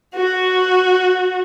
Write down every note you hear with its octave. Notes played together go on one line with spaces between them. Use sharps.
F#4